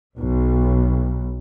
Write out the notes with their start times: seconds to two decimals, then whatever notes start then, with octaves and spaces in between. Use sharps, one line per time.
0.18 B1